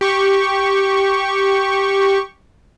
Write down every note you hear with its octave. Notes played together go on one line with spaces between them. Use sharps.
G4 C#6